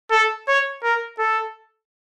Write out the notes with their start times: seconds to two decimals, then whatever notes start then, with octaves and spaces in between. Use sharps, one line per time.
0.11 A4
0.48 C#5
0.83 A#4
1.19 A4